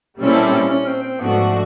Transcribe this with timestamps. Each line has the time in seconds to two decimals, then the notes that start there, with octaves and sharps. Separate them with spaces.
0.19 A#2 G3 C4 C#4 E4 A4
0.44 C#4
0.69 C#4
0.86 C4
1.03 C4
1.19 G#2 F3 A3 B3 D4 F#4